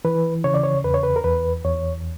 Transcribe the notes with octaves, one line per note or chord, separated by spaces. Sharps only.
E3 B4
C#3 C#5
D5
C#5
E2 B4
C#5
B4
A#4
E2 B4
E2 C#5